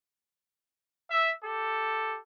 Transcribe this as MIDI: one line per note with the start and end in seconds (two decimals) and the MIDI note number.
1.09 1.31 76
1.43 2.17 67
1.43 2.17 69